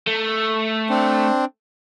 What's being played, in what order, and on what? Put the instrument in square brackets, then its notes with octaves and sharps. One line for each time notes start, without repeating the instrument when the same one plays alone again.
[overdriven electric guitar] A3
[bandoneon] C4 D4